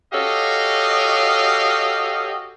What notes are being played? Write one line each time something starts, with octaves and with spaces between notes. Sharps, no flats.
F#4 G4 A4 C#5 D#5 F5